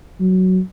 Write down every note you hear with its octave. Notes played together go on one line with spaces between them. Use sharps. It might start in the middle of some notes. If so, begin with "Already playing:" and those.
F#3